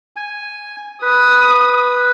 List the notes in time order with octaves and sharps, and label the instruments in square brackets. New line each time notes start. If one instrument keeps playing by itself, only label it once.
[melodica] G#5
[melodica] B4 [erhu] D#6